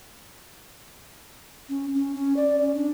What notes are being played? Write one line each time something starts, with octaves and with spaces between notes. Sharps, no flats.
C#4
C#4
C#4
D5
C#4
D4